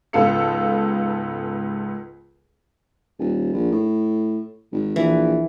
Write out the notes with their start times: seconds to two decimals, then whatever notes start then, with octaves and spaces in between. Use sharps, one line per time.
0.13 C#2 G#2 B3 A4 F5 C#7
3.19 D#1
3.53 A#1
3.72 A2
4.73 G#1
4.96 A#1 E3